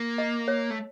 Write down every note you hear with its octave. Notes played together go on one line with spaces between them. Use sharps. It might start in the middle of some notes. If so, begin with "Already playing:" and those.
Already playing: A#3
D#5
C#5
A3